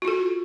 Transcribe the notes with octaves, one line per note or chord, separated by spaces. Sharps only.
F4 F#4 A4